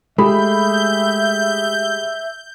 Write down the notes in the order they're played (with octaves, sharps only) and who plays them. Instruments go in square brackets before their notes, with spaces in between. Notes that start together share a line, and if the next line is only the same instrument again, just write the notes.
[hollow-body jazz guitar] G#3 A3 [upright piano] G4 G#4 B5 [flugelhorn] E5 [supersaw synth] G6